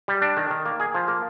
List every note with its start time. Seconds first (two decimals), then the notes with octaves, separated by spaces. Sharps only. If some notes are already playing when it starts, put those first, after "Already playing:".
0.08 G3
0.22 D4
0.37 D#3
0.51 D#3
0.66 A#3
0.80 G#4
0.95 F3
1.08 A#3